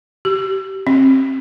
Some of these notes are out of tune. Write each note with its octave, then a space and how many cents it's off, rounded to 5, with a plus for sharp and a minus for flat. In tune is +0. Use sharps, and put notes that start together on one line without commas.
G4 -30
C4 +30